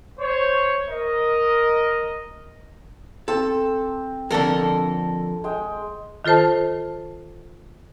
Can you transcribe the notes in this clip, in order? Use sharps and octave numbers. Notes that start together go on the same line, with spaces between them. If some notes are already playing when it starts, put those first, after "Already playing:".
C5 C#5
A#4 D#5
C4 A4
F2 D3 A4 A#4
G#3 G5
D#3 F4 A4 C5 A5